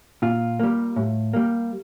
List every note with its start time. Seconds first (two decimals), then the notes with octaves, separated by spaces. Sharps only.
0.22 A#2 F4
0.59 G3 A#3
0.96 A2
1.33 G3 A#3